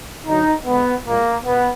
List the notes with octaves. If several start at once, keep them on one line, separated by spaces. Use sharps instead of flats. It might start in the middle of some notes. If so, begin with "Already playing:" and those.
D3 F#3 D#4
D3 G#3 B3
A#2 G#3 A#3
B2 B3